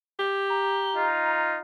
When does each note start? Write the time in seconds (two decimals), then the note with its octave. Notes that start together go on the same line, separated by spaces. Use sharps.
0.19 G4
0.50 A#5
0.96 D#4 F4